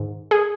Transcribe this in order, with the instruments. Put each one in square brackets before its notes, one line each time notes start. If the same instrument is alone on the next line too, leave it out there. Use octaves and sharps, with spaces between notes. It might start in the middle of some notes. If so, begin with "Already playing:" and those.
Already playing: [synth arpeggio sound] G#2 D#3
G#4